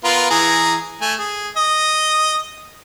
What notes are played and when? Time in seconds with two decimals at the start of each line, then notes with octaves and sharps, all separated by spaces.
0.04 B3 F4 A#4
0.31 E3 G#4 A#5
1.01 A3 G#5
1.19 G#4
1.57 D#5